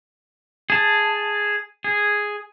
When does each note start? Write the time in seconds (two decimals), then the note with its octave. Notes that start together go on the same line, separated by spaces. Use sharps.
0.70 G#4 A5
1.84 G#4